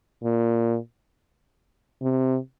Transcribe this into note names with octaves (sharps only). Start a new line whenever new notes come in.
A#2
C3